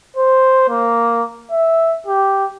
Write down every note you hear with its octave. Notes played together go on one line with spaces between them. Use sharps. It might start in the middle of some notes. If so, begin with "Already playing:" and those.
C5
A#3
E5
G4